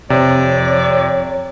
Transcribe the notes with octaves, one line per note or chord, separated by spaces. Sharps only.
F2 C3 C#5 D5